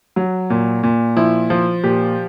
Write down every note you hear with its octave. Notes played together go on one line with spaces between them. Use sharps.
F#3
A#2
A#2
F3 E4
F3
A#2 G4